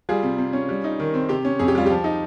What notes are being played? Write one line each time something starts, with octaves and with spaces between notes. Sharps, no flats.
G3 F4 G#4
C3
C3
C#4
G3
D#4
D#3
C4
C3 G4
C#4
F2 G#4
G4
G3 F4
F3 G4
D#4